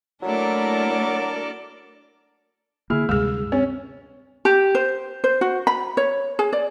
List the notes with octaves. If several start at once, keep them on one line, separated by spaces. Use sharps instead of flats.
F#3 A3 A#3 D4 E4 A4 A#4 D5
D3 A#3 E4 G#4 F6
D2 G2 C3 G#3 G#4 E6
C4 C#4
G4
C5
C5
F#4
B5
C#5
G#4
D5